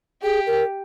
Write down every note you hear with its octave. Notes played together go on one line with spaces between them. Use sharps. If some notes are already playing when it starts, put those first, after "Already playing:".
G4 G#4
A#4